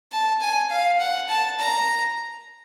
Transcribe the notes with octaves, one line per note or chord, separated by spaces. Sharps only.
A5
G#5
F5
F#5
A5
A#5